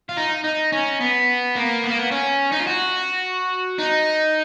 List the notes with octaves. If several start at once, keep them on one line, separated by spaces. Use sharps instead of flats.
F4
D#4
D#4
C#4
B3
A#3
B3
A#3
B3
C#4
D#4
F4
F#4
D#4